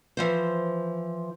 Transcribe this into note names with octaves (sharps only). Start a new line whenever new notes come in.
E3 F3 C5